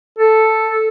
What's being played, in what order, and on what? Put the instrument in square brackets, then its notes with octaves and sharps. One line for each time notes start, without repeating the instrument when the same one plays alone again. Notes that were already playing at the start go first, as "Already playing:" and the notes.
[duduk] A4